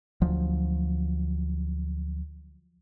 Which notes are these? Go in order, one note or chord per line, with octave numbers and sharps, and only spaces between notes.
D2 F3 F#3